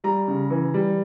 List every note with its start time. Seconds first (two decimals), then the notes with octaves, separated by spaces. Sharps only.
0.04 G3 A#5
0.28 C#3
0.50 E3
0.74 G3